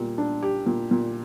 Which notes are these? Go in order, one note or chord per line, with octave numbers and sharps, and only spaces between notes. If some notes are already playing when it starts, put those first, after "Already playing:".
Already playing: A#2 G3
D4
G4
A#2
A#2